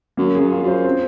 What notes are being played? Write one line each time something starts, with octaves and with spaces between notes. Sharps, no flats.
F#2 A#3
G#4
F#2
F4
F#2
C5
C4